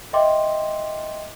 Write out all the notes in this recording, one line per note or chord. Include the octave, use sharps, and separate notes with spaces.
D#5 E5 G5 C6 D6